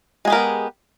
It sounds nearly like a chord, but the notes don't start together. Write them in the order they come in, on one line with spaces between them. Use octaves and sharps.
G#3 G#4 G4 A#4 B3